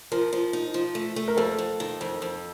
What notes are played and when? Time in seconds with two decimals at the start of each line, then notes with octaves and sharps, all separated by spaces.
0.12 F3 A#4
0.33 F3
0.53 D#4
0.74 F3
0.95 A3
1.16 A3
1.28 A#4
1.37 F2 A4
1.58 F2
1.80 D#3
2.01 F2
2.22 F2